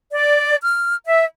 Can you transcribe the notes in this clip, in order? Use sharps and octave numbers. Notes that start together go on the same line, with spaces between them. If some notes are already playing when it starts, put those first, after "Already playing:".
D5
F6
E5